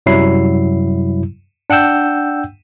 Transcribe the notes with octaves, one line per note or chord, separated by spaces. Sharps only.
F#2 C3 F#3 G3 E4 C7
D4 F#5 G5 E6 G6